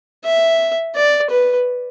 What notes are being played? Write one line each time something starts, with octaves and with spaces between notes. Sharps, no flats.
E5
D5
B4